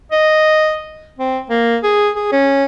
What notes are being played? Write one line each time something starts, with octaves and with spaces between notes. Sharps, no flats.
D#5
C4
A#3
G#4
G#4
C#4